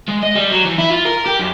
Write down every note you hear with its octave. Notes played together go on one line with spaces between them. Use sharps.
G#3
D#5
G3
F#3
E3
E4
F4
A#4
G4
F#2